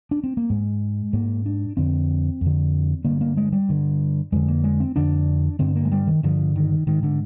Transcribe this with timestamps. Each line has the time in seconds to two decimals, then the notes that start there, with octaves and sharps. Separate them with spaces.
0.11 D4
0.24 C4
0.37 A#3
0.50 G#2 G#3
1.13 G#2 A#3
1.46 D4
1.77 F2 D3 C4
2.41 F2 D3
3.04 G2 D3 A#3
3.21 A#3
3.37 G#3
3.52 G3
3.69 G2 D3
4.32 F2 D3 G#3
4.48 A#3
4.64 G#3
4.80 C4
4.96 F2 D3 D4
5.59 G2 D3 C4
5.76 A#3
5.85 G#3
5.91 G3
6.07 D#3
6.23 G2 D3 F3
6.56 D#3
6.87 G#2 D#3
7.03 D3